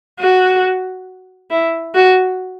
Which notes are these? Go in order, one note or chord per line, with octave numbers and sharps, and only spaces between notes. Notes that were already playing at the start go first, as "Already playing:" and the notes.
F#4
E4
F#4